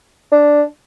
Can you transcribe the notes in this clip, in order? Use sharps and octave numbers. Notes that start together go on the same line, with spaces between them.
D4